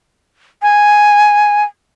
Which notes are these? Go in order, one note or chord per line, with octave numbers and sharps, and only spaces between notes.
G#5